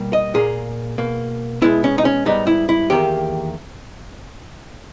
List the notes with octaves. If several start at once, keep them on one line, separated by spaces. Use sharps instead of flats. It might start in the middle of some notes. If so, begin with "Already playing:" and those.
Already playing: B2 G3 A#3
D#5
A#2 A#3 G#4
B2 A#3
B2 G#3 B3 E4
C#4
D#4
C#4
G#2 G3 B3 D#4
E4
E4
E2 D#3 A#3 G4